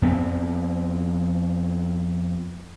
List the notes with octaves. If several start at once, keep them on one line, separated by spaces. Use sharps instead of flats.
F2 B3 C4